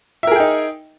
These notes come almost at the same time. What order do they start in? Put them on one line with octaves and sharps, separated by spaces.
E5 A#4 G#4 G5 D#4